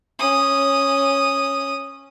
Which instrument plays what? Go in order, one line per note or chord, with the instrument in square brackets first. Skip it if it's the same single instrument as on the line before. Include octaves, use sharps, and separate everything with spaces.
[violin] C#4 D#6